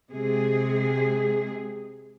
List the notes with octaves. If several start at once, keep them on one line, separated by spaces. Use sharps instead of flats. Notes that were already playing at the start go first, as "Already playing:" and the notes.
C3 G#3 G#4